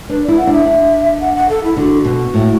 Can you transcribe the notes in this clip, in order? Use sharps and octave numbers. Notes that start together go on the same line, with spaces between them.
D4 B4
E4 D5
F#5
D4 E5
D4
F#5
F#5
A4
E4
D3 F#4
B2
A2